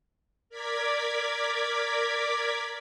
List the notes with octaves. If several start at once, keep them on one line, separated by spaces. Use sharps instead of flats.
A#4 D5 D6 G#6 B6